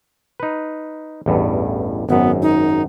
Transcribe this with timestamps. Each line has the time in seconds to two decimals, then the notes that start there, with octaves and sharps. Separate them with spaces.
0.40 D#4 B4
1.26 A1 E2 G2
2.09 G#1 F#2 B3
2.42 D#4